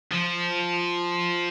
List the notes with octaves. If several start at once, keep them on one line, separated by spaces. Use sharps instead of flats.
F3